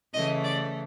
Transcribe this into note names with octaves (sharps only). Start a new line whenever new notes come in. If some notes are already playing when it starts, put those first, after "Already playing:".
C#3 E3 A3 D#5
D5